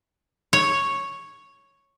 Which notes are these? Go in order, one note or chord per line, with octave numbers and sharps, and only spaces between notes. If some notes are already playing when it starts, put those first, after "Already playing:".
C#5